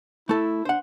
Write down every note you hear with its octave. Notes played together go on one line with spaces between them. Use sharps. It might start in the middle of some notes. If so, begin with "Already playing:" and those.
A3 E4 A4
D4 C5 F#5